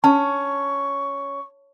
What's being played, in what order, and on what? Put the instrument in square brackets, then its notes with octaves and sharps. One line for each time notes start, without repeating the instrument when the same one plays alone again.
[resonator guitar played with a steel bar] C#4 [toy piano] A5 [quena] C#6